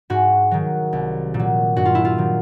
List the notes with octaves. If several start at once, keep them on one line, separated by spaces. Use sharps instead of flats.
G#2 F#4
D#3 F#3
C2
A#2
F#3
G2 F#4
F4
E4
F4
D#3 F#3